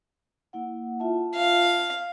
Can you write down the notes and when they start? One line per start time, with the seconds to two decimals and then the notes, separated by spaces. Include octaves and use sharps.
0.53 A#3 E4 F#5
1.00 F4 E5 A5
1.35 F5